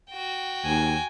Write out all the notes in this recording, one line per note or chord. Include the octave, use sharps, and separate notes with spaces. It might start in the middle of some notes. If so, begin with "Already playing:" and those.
F#4 G5
D#2 G#5